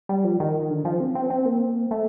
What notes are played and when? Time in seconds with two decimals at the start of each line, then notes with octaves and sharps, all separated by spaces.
0.09 G3
0.24 F3
0.40 D#3
0.70 D3
0.85 F3
1.00 C4
1.15 C4
1.30 C4
1.46 A#3
1.91 A3